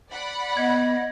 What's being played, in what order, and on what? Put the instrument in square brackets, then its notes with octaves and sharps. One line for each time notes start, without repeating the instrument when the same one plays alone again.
[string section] D5 F#5 B5
[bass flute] B3 [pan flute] D#5 [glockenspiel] G#6